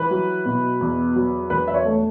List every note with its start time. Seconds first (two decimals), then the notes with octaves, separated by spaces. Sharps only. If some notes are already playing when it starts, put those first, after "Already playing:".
Already playing: E3 B4
0.11 F#3
0.46 B2
0.81 E2
1.16 F#3
1.50 E1 B4
1.68 E5
1.74 C#5
1.85 A3